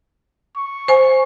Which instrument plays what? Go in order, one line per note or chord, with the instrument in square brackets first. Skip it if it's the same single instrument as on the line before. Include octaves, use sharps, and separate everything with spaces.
[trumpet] C#6
[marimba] C5 G#5